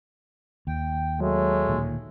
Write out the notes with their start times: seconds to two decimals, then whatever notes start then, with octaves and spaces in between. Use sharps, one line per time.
0.67 D#2 G5
1.20 F#3 G#3 A3
1.67 D1 A#2 D#3